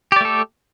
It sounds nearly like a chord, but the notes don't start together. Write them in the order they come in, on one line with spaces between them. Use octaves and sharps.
G4 D5 A3 A4